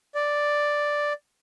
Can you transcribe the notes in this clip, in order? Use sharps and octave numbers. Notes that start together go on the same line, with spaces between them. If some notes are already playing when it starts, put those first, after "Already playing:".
D5